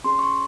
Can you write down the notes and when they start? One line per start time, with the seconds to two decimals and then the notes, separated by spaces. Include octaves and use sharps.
0.04 C#4 G#4 C6
0.19 C#6